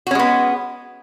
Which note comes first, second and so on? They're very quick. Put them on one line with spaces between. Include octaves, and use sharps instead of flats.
F#4 C#4 G#3 B3